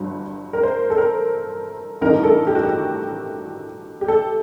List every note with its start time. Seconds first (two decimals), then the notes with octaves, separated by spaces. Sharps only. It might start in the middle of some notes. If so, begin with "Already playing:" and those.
Already playing: G1 G2 F#3
0.53 A#4
0.63 C5
0.90 A4
0.98 A#4
2.01 A1 G2 D#3 A3 D#4 A#4
2.24 A4
2.47 G4
2.55 F#4
2.63 G4
4.01 G4
4.08 A4